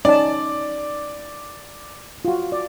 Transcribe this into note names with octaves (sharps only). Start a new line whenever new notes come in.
C#4 D#4 D5 A5
F4 F#4
D5